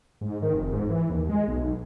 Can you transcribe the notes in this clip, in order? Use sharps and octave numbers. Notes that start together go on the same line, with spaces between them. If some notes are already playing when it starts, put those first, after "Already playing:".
G#2
D#3
F1
G#2
E3
D#2
G#3
B1